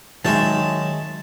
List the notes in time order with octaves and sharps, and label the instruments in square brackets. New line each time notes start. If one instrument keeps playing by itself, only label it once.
[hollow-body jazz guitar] D#3 F#3 [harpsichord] G#3 E5 A5